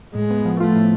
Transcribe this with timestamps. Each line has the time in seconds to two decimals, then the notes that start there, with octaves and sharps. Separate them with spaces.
0.15 A2 G#3
0.30 B3
0.45 F3
0.60 A3 F4
0.76 A2